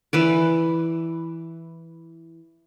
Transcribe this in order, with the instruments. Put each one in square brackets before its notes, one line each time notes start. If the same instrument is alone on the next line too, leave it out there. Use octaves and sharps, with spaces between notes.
[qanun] E3 B4 D5